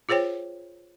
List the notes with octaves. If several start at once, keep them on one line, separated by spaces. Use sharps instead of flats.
F4 G#4 C5 C#5 G5